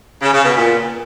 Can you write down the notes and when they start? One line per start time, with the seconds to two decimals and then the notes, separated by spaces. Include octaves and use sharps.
0.22 C#3
0.33 C#3
0.45 B2
0.56 A#2